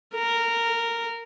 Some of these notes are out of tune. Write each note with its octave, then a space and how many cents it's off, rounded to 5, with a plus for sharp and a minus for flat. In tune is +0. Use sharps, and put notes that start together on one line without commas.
A#4 -10